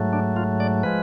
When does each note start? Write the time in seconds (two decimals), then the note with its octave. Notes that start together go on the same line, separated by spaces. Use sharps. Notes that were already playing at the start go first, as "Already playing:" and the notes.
Already playing: G#2 F#3 A3
0.13 D4
0.36 F4
0.60 D5
0.83 F3 G#3 B4